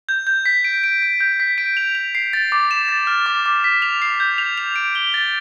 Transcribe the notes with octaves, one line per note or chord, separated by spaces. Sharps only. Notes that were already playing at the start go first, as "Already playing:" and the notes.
G6
G6
B6
D7
D7
D7
G6
B6
D7
F7
F7
C7
A6
D6
E7
A6
F6
D6
D6
B6
F7
C7
G6
F7
F7
D7
G7
A6